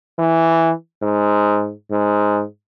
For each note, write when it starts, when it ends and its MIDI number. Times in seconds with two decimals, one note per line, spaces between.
0.19 0.72 52
1.02 1.72 44
1.91 2.43 44